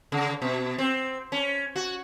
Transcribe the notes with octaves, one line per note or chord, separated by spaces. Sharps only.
C#3
B2
C4
C#4
F#4